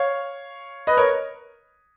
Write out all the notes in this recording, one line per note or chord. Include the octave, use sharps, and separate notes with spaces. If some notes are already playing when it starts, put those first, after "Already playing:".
Already playing: C#5 F5
B4 D#5
A#4 C#5